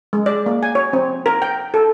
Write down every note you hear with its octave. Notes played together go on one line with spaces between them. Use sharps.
G#3
D5
A#3
G#5
C#5
C4
A#4
G5
A4